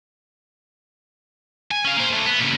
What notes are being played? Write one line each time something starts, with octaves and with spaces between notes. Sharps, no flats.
G#5
C#4 F5
A#3 C5
D3 A3
B3
A#2 C#3